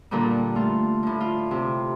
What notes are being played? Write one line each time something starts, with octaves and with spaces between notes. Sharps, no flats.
A#2 D3 G3
A3 F4
A2 D3
F4
C3